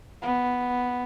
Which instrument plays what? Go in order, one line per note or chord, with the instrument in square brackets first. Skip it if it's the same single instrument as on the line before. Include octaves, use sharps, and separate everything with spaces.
[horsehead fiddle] B3